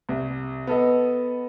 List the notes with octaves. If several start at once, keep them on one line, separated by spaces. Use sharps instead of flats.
C2
B3 A4 D#5